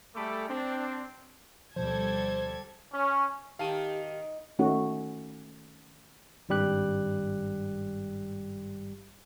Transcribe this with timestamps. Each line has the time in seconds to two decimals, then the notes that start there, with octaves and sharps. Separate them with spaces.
0.16 G3 A3 G#4 A4 B5 D6
0.49 C4 D4
1.76 D2 B2 F3 G3 A4 C5 G#6
2.92 C#4
3.59 D#3 G4 F5 A5 D#7
4.59 D#3 A3 C#4 D#4 F#4
6.49 G#1 G2 G3 G4 F#6